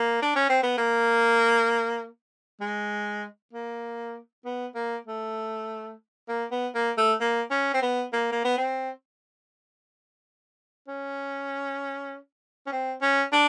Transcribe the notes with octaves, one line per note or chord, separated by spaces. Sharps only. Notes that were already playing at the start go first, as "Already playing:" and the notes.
Already playing: A#3
D4
C#4
C4
B3
A#3
G#3
A#3
B3
A#3
A3
A#3
B3
A#3
A3
A#3
C#4
C4
B3
A#3
A#3
B3
C4
C#4
C#4
C4
C#4
D4